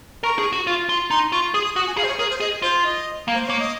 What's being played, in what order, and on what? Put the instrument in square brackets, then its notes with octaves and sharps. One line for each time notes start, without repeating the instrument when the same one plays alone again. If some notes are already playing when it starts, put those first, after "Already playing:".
[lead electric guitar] A#4 [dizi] C#6
[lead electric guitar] G#4
F#4
F4
F4
[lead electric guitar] D#4 [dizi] C6
[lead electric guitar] F4 [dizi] C#6
[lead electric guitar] G#4 [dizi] D#6
[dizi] D#6
[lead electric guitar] F#4 [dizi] D#6
[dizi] G#5
[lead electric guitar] G#4 [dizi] F5
[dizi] C5
C#5
[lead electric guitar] G#4 [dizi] A#4
[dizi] C5
[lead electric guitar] G#4 [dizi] D#5
[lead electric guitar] F4 [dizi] C5
[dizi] D#5
[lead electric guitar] A#3
[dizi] C5
[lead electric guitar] A#3 [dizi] C#5
[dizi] D#5